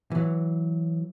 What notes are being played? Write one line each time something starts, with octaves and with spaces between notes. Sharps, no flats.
E3 F#3